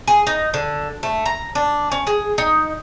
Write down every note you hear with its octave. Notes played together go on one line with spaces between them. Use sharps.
G#4
D#4
D3
A3
A#5
D4
C#4
G#4
D#4